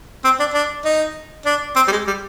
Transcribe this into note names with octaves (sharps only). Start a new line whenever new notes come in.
C4
D4
D4
D#4
D4
C4
G3
G#3
G3